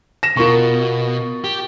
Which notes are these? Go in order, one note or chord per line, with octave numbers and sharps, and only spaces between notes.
A#6 E7
B2 F4 A#4 C#6
G4